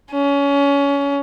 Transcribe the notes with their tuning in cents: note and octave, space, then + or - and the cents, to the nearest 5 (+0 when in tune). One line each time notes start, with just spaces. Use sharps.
C#4 +25